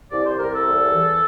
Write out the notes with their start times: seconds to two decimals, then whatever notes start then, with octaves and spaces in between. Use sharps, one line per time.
0.11 C2 D5
0.26 C5
0.38 C2 A#4
0.53 A4
0.67 E2
0.93 E3